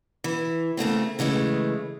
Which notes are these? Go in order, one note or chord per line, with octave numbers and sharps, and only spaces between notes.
E3
C#3 A3 A#3 C4
C#3 E3 G#3 A3